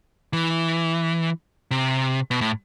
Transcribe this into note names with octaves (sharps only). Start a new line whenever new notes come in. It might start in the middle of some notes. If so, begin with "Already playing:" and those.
E3
C3
B2
A2